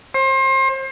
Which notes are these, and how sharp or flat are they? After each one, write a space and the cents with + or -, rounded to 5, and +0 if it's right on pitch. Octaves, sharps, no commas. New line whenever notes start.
C5 +35